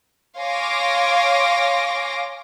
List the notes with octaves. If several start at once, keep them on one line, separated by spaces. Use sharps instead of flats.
C#5 F5 G#5 C6 D6 A#6